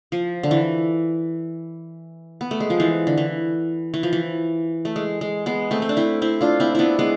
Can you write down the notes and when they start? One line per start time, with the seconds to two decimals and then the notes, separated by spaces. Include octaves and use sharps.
0.12 F3
0.43 D3
0.51 E3
2.41 B3
2.51 A3
2.60 G#3
2.70 F3
2.80 E3
3.07 D3
3.18 E3
3.94 E3
4.03 F3
4.13 E3
4.85 A3
4.96 G#3
5.21 G#3
5.46 G#3 B3
5.71 A3 C4
5.82 C4
5.89 D4
5.97 C4 E4
6.22 C4 E4
6.41 D4 F4
6.60 C4 E4
6.75 B3 D4 E4
6.99 G#3 B3